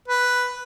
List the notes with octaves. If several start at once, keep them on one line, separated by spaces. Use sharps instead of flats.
B4